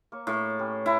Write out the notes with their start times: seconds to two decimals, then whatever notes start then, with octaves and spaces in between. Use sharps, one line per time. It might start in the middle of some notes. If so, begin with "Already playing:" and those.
0.12 A#3 C#5
0.27 A2
0.59 C#4 G4 B4
0.86 E4 G5 A#5